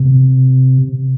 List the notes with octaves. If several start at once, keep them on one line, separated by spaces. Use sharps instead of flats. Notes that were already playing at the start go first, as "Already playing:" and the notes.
Already playing: C3